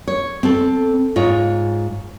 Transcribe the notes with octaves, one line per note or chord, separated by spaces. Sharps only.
C#5
C4 A4
G#2 F4 C#5